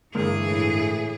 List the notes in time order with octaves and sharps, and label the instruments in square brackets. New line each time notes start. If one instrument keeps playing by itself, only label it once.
[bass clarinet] G2 [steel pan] D3 G#3 A#3 [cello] E3 G#4
[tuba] A2